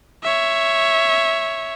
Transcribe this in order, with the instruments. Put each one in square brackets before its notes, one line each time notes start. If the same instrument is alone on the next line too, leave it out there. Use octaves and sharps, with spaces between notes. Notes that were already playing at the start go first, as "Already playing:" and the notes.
[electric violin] C#5 E5